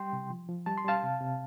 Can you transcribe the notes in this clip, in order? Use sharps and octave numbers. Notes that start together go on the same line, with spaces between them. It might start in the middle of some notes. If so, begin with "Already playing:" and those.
Already playing: G3 G5 C6
C3
F3
F3
G3 A5
C6
G3 F5 A5
C3
C3